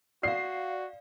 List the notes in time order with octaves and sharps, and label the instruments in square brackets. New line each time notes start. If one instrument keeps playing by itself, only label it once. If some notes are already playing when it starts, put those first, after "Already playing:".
[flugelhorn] F#4 [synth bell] D5 F5 [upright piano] C7